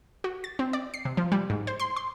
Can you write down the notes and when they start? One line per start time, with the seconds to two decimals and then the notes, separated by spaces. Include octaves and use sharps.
0.24 F#4
0.44 A6
0.59 C4
0.73 D5
0.94 C7
1.05 C3
1.17 F3
1.32 G3
1.50 G#2
1.67 C5
1.80 C6
1.96 C6